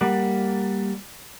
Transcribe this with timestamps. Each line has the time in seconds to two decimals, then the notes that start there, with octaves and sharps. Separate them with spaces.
0.01 G3 A#3 D5 F#5